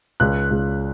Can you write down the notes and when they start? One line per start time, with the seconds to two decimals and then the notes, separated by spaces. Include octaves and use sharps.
0.20 C#2 F#6
0.51 C#2